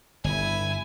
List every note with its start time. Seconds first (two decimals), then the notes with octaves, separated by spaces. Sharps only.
0.24 G1 E4 G#5